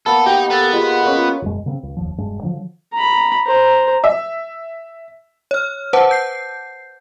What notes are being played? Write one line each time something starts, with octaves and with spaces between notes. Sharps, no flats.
A#3 B3 A4
D#4 G4 G5
B3 A4
G#3 F4
A#3 C#4
F4
E1 F#2 G#3
C#3 A#3 C4
C#2
F1 D#2 F3
E1 G2 G#3 D4
D3 F3 F#3
A#5 B5
C5 A#5
E5
C#5 F6
B4 C5 F#5 A5 D6
G6 C7